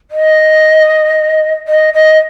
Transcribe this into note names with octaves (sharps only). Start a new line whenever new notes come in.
D#5
D#5
D#5